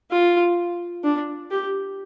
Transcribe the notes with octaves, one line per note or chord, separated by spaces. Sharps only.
F4
D4
G4